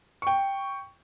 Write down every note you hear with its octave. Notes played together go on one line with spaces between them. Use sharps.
G5 C#6